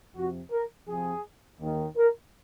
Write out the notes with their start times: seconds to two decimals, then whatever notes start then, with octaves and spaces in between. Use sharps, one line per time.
0.16 F2 C3 F3 F#4
0.52 A#4
0.87 F2 C3 F3 G#4
1.60 D#2 D#3
1.96 A#4